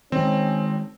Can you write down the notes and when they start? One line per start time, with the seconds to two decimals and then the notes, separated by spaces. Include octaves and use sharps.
0.12 D#3 G#3 C4 C#4